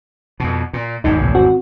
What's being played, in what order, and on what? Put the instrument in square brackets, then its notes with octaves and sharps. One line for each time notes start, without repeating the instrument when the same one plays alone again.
[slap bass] F2 B2
A#2
[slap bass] G#1 E2 A2 [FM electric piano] D#4
[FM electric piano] C2 B2
C4 F#4